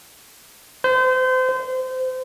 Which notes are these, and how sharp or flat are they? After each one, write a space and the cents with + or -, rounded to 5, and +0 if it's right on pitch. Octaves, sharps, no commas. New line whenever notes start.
C5 -30
C5 -25